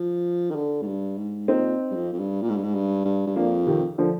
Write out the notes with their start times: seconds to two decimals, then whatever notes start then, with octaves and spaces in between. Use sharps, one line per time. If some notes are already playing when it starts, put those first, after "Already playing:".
Already playing: F3
0.51 D#3
0.55 D3
0.82 G#2
0.86 G2
1.18 G#2
1.48 A#2 C4 D#4
1.91 G2
1.96 F2
2.13 F2
2.19 G2
2.42 A#2
2.49 G#2
2.56 G2
2.63 G#2
2.74 G2
3.05 G2
3.27 G2
3.36 F2 A#3 D4
3.67 C3 D#3
3.98 D3 F3